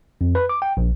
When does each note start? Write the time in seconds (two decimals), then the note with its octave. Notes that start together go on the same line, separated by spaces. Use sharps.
0.21 F2
0.35 B4
0.49 D6
0.62 G5
0.77 A#1